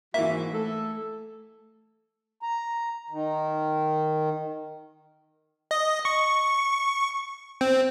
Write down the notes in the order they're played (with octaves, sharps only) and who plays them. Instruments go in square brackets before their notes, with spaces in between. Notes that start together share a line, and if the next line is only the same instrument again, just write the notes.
[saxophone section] G#2 F3 F#4 [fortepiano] E3 A#3 [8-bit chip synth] E5
[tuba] A3 [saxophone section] A4
[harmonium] A#5
D#3
[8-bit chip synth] D#5
C#6
C4